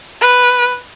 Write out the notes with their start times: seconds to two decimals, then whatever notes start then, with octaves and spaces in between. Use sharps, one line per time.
0.21 B4